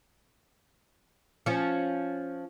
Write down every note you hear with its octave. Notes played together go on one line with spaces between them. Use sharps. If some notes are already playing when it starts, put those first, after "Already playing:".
F3 C#4